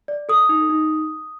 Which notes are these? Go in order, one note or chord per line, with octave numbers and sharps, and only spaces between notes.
D5
A4 D#6
D#4
D#4